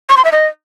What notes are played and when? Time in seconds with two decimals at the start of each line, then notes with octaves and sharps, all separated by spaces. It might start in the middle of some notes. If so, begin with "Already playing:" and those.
0.09 C#6
0.17 C6
0.25 E5
0.32 D#5